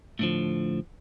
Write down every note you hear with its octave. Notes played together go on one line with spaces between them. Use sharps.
A2 D3 F3